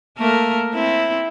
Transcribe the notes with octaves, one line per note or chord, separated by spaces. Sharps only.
A3 A#3 A#4
C4 E4